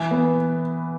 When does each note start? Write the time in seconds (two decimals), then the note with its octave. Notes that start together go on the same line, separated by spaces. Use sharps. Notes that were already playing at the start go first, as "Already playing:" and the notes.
Already playing: E3
0.11 B3